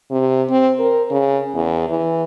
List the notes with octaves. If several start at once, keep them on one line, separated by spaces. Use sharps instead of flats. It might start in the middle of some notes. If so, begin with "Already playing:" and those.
C3
C4
A#4
C#3
E2
E3